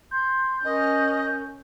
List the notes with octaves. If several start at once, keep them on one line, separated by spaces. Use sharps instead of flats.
C6 G6
C#4 A#4 D#5